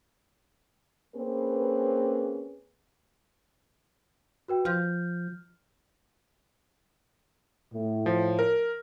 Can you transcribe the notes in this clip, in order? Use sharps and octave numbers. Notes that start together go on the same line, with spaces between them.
A#3 C4 C#4 G#4 B4
F#4 B4 G5
F3 F6 G6
A2
F3
A#4